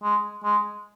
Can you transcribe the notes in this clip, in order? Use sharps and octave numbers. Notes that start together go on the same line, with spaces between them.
G#3
G#3